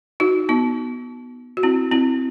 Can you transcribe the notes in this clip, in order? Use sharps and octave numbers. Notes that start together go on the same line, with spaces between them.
D#4 F#4
B3 D#4
F#4
C4 E4
C4 E4